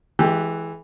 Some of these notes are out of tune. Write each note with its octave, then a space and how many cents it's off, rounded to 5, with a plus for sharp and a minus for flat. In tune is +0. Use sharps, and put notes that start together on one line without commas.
E3 +0 G#3 +30 G4 +0